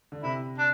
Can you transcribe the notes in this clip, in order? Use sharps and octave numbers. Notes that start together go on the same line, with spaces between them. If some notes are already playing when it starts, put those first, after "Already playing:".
D3
C3 E4
D4